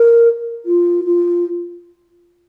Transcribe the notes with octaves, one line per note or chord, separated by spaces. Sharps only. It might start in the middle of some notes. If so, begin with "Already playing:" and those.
Already playing: A#4
F4
F4